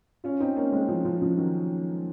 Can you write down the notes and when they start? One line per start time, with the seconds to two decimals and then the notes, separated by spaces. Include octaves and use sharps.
0.24 C#4 F4
0.40 C4 D#4
0.56 A#3 C#4
0.72 G#3 C4
0.88 F3
1.05 F3
1.22 F3
1.37 D#3 F#3